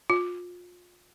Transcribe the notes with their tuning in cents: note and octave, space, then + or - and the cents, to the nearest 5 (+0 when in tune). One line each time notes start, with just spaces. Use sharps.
F4 +30